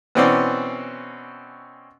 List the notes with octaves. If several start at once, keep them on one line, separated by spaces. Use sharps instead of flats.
B2 E3 C4 C#4 D5 C6